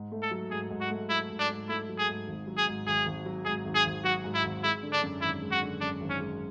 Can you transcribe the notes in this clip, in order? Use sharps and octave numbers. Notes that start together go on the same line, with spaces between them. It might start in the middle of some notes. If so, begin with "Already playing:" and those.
Already playing: G#2
A3
A4
F#3
G#2 G#4
G#2
F#4
A3
F#3 E4
G#2
D4
G#2
A3 E4
F#3
G#4
G#2
G#1
F#3
G#4
G#2
G#1 G#4
G#1
F#3
G#2 G#4
G#1
G#4
G#1
F#3 F#4
G#2
E4
G#1
G#3 E4
D3
D4
F#2
G#1 E4
G#3
F#4
D3
F#2 D4
G#1
C#4
G#3